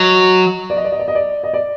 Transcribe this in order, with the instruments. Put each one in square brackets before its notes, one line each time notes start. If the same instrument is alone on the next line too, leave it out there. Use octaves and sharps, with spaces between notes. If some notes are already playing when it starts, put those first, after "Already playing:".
Already playing: [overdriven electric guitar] F#3 [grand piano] D#5
[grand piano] D5
D#5
D5
D#5
D5
D#5
D5
D#5
D5